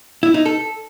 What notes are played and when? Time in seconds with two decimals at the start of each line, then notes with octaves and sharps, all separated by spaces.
0.23 E4
0.34 D#4
0.46 A4